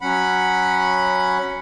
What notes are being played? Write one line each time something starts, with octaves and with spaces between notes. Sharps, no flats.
F#3 C#4 F#5 B5